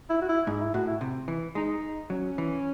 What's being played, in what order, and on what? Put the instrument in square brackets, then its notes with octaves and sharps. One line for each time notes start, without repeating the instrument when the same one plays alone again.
[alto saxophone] E4
F#4
E4
[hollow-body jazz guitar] G#2 [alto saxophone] D#4
[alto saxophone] E4
[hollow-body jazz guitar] A2 [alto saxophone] F#4
[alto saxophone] E4
[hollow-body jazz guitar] C3
E3
[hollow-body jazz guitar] G#3 [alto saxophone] D#4
[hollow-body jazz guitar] F#3 [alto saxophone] C#4
[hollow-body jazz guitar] E3